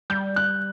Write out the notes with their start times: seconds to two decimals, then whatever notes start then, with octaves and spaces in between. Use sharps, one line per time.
0.10 G3 G6
0.36 F#6